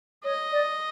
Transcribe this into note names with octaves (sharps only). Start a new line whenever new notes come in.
C#5 D#5
D5